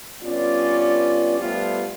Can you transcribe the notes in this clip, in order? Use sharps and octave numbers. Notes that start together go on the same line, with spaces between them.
G2 B3 C#4 F4 D5
F3 G3 A3 B3 F4